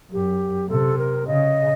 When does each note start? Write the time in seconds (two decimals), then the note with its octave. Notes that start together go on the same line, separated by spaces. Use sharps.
0.12 F#2 G4
0.69 C3 A4
0.98 A#4
1.27 C#3 D#5